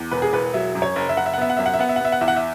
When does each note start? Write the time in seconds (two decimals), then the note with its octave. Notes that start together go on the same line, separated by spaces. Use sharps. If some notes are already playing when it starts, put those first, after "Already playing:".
Already playing: E2
0.11 E1 B4
0.22 G#4
0.33 E1 B4
0.54 F#3 E5
0.75 F#2
0.82 C#5
0.96 F#1
1.09 E5
1.17 F#1 F#5
1.26 E5
1.33 F#5
1.38 B3 E5
1.50 F#5
1.57 F#2 E5
1.66 F#5
1.74 E5
1.79 B3 F#5
1.89 E5
1.96 F#5
2.01 B3 E5
2.12 F#5
2.21 E2 E5
2.28 F#5
2.36 E5